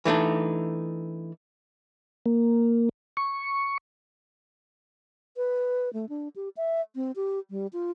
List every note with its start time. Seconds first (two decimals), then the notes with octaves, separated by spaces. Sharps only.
0.05 E3 A3 D4 D#4
2.26 A#3
3.17 C#6
5.37 B4
5.93 A3
6.09 D4
6.36 G4
6.57 E5
6.95 C4
7.16 G4
7.50 G3
7.73 F4